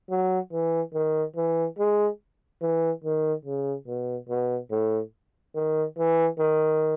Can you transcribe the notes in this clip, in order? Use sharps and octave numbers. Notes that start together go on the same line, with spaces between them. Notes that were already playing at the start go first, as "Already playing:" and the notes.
F#3
E3
D#3
E3
G#3
E3
D#3
C#3
B2
B2
A2
D#3
E3
D#3